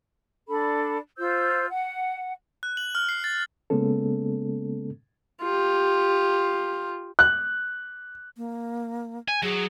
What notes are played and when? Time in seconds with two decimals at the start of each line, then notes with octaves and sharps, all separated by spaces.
0.48 D4 A4 B5
1.18 F4 C5 E6 G6
1.69 F#5
2.63 F#6
2.77 F#7
2.95 F6
3.09 C7
3.24 A6
3.70 C#3 G#3 A#3 B3 C#4 A4
5.41 F4 G4
7.19 F#6
8.37 A#3
9.28 G#5
9.43 F#3 G#4